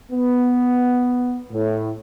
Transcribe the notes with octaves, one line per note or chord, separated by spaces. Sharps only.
B3
A2